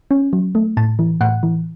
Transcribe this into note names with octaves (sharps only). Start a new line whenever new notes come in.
C#4
F#3
A3
A2 A5
E3
A2 F#5
E3